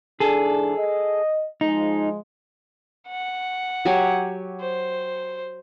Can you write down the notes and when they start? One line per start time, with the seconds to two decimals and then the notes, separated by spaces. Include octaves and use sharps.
0.20 G#2 E3 D4 G#4 A4
0.77 D#5
1.61 F3 G#3 D#4
3.08 F#5
3.85 F#3 G4 G#5
4.61 C5